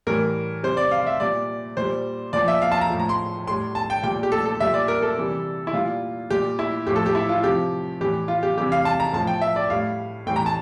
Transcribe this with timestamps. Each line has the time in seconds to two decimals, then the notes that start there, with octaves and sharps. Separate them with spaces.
0.07 A2 E3 G3 A#4
0.63 C3 G3 C5
0.77 D5
0.91 F5
1.07 E5
1.20 A#2 G3 D5
1.77 A#2 C5
1.82 G3
2.33 A#2 F3 D5
2.48 E5
2.62 F5
2.72 A5
2.81 A#5
2.90 A2 F3
3.00 A#5
3.09 C6
3.47 A2 G3 C6
3.75 A5
3.90 G5
4.03 A#2 G3 G5
4.23 G4
4.32 A4
4.45 A4
4.60 A#2 G3 E5
4.74 D5
4.88 A#4
5.02 A4
5.17 C3 E3 G3
5.67 E4
5.73 A#2 G3 F4
6.30 A#2 G3 G4
6.59 E4
6.87 A2 F3 G4
6.96 A4
7.06 G4
7.15 E4
7.29 F4
7.44 C3 F3 G4
8.01 A2 E3 G3 G4
8.28 F4
8.43 G4
8.57 C3 E3 G3 G4
8.72 F5
8.85 A5
9.00 A#5
9.13 A2 F3 A5
9.27 G5
9.41 E5
9.56 D5
9.70 A2 G3 F5
10.27 A2 E3 G3 G5
10.36 A#5
10.46 A5